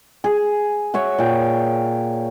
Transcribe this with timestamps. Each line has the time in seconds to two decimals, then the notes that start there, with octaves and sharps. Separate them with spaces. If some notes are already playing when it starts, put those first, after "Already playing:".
0.24 G#4
0.94 F#4 C#5 E5
1.18 A#2 G5